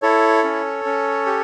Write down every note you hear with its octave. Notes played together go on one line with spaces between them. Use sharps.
E4 A4 C#5
C#4
C#4
G4